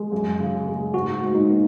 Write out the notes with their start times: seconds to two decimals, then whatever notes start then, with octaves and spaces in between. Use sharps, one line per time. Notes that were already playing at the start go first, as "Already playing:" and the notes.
Already playing: G#3 G#4
0.12 F#2
0.40 C#3
0.67 G#3
0.94 G#2 F#4
1.22 G#2
1.35 D#4
1.49 A#3